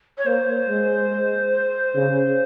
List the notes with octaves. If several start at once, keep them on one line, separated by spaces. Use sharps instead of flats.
C#5
A#3 C5
G#3
C#3